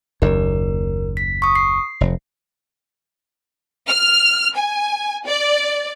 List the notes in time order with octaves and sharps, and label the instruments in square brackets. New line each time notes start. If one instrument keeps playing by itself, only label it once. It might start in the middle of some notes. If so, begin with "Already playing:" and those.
[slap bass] F#1 D#2 [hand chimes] A#4
[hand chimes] B6
C#6 D#6
C7
[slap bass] F1
[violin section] F6
G#5
D5